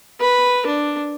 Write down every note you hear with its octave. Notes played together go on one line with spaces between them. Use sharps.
B4
D4